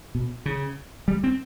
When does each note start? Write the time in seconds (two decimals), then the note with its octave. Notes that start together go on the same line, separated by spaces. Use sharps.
0.15 B2
0.46 C#3
1.08 G3
1.24 C4